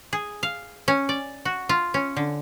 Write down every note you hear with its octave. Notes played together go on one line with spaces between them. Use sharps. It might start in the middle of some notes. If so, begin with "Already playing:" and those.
G#4
F5
C#4
D5
F#4
F4
C#4
D3